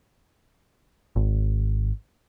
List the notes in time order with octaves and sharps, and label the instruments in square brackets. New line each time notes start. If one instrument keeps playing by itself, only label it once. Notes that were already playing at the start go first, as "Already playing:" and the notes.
[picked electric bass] G#1